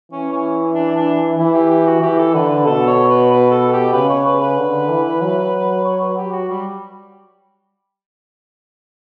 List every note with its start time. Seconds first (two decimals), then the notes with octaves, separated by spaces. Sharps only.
0.12 E3 C#4
0.32 C#4
0.74 D4
0.97 D4
1.38 E3 E4
1.54 G4
1.70 G4
1.86 F#4
2.02 E3 G4
2.18 A4
2.34 D3 B4
2.50 B4
2.66 B2 A4
2.87 C#5
3.09 B4
3.30 B4
3.51 A4
3.72 G4
3.93 C#3 B4
4.09 C#5
4.25 B4
4.41 B4
4.58 D3
4.89 E3
5.21 F#3
5.84 C#5
6.00 B4
6.17 G4
6.32 F#4
6.49 G3